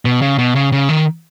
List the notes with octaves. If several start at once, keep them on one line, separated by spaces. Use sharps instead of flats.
B2
C#3
B2
C#3
C#3
D#3